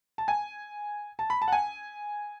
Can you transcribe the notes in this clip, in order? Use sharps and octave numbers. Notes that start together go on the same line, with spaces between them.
A5
G#5
A5
B5
A5
F#5
G#5